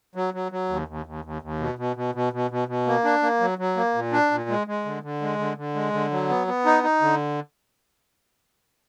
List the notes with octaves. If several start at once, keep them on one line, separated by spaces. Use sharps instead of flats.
F#3
F#3
F#3
D#2
D#2
D#2
D#2
D#2
B2
B2
B2
B2
B2
B2
B2
A#3
D4
A#3
F#3
F#3
A#3
A#2
D4
A#2
G#3
G#3
D3
D3
G#3
D3
D3
G#3
D3
F#3
B3
B3
D#4
D#4
D3